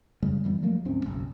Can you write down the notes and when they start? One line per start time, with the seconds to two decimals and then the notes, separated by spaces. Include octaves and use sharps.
0.23 F#2 C#3 G3 G#3
0.44 F#2 E3 G3 B3
0.62 F3 F#3 A3 A#3
0.85 D1 G#2 C4 C#4
1.05 F#1 B1